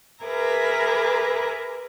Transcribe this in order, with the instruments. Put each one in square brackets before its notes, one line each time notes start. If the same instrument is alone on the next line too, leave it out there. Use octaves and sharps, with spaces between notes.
[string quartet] G#4 A#4 B4 E5 A#5 D6